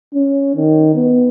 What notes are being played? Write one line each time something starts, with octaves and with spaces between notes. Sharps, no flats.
C#4
D#3
B3